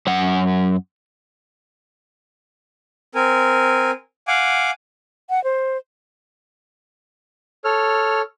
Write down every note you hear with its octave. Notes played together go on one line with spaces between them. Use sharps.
F#2 F#5
C4 A#4 G#5
F5 F#5 G#5 D6
F#5
C5
A4 C#5 F6